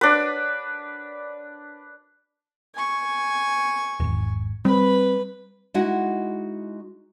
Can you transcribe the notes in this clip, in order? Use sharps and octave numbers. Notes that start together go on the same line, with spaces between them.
D4 B4
G#5 C#6
D1 G#1 E2
G3 C4 B4 B5
G#3 D#4 E4 F#4 F#5